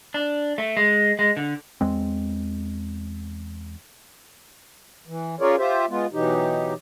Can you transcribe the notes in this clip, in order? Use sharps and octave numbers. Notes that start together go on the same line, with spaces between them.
D4
A3
G#3
G#3
D3
E2 G#3 C4
E3
C#4 F4 G#4 A#4 C#5 D5
F4 G4 C5 E5
G#3 B3 F4
B2 E3 F#3 D#4 G4